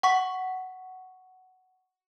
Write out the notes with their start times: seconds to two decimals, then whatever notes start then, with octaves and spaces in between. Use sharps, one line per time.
0.03 F#5 C#6 B6